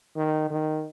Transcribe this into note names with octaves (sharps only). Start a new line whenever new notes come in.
D#3
D#3